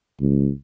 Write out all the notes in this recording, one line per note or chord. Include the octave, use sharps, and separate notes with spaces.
C#2